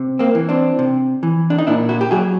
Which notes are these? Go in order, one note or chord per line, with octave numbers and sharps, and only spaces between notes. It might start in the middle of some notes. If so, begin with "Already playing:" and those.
Already playing: C3
A#3 C4
E3
C4 D4
C3
E3
D4
D#4
A#2 D4 E4
E4 F#4
G4
F#3 F#4 G#4